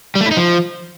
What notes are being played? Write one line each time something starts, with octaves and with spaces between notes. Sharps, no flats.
G3
A3
E4
D#4
F3